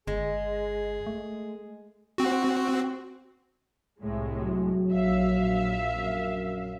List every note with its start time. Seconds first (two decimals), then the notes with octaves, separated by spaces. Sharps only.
0.07 G1 G#3 G#4
1.06 A3
2.18 C4 F#4
4.00 C2 A2 G#3
4.42 F#3
4.92 A#1 E5 F5
5.97 F#2